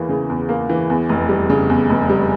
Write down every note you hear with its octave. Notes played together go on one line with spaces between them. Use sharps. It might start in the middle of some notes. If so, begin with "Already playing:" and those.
Already playing: E2 E3 A#3
C#3
E2
A#3
E3
E2
F1
G3
C#3
E2
F1
G3